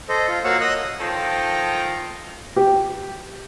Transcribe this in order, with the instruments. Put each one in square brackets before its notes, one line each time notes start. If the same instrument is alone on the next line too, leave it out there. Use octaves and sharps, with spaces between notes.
[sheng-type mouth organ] A4 C5 D#5
F4
A#3 F#4 C#5 F5 F#5 E6
D#5 D#6 E6 F#6
[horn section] D#3 F3 F4 A4 G5 A#5
[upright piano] G4